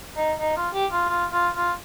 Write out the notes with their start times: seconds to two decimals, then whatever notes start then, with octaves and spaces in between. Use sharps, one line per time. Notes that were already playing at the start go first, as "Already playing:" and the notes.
0.17 D#4
0.40 D#4
0.57 F4
0.74 G4
0.92 F4
1.09 F4
1.32 F4
1.55 F4